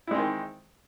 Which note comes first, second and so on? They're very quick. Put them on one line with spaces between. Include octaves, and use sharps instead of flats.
E4 G#3 C4 D#3